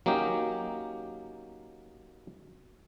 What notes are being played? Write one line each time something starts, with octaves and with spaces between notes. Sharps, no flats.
F#3 A#3 C#4 D#4 G4